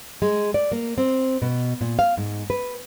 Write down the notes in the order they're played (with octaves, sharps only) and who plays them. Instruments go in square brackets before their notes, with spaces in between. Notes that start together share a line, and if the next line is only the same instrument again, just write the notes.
[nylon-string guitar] G#3
D5
A#3
C4
B2
A#2
F5
G#2
B4